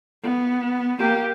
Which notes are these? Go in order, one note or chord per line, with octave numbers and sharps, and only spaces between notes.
B3
A#3 G4